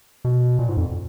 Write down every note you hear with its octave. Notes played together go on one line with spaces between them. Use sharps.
B2
A#2
G#2
F2